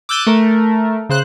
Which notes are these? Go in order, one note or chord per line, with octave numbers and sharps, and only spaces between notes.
D6 E6 F#6 G6 A6 D#7
A3 A#4
C#3 C5 F#6